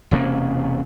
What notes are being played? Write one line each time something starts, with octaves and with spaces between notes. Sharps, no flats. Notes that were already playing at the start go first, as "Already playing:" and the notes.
E1 C3 A#3 C#4